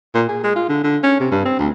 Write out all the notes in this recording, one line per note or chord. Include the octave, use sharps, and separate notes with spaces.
A#2
G#4
G#3
F4
D3
D3
C#4
C3
G2
C4
D2